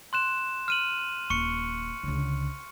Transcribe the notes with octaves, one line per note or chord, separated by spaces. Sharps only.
C6 F#6 E7
F6 D#7 F#7
D#1 C#6 C#7
C#2 D3